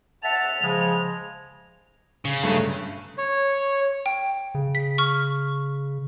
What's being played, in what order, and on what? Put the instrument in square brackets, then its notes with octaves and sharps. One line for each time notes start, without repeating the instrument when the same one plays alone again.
[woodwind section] E5 F#5 A5 [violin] F7
[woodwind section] C#3 F3 G#3
[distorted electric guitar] C#3
[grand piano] G2 F#3 A3
[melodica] C#5
[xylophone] G5
[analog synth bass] C#3
[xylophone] B6
C#6 F6